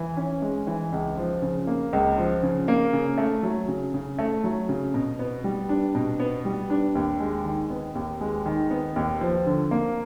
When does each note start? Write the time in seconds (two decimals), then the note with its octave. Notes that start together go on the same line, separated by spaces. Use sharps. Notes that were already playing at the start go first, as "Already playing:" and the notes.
Already playing: E3
0.17 C#4
0.42 G#3
0.67 E3
0.92 C#2
1.17 F3
1.42 C#3
1.67 A#3
1.93 C#2
2.18 F3
2.43 C#3
2.68 A#3
2.93 C#3
3.18 A3
3.43 F#3
3.68 C#3
3.94 C#3
4.19 A3
4.44 F#3
4.69 C#3
4.94 B2
5.19 B3
5.44 G3
5.69 D4
5.95 B2
6.20 B3
6.45 G3
6.70 D4
6.95 D#2
7.20 G#3
7.45 D#3
7.70 B3
7.95 D#2
8.21 G#3
8.46 D#3
8.71 B3
8.96 D#2
9.21 F3
9.46 D3
9.71 A#3